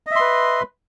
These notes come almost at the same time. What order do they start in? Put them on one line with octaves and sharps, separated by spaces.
D#5 E5 C6 B4